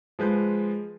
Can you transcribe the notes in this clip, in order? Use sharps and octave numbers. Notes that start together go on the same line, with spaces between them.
F3 G#3 B4 G6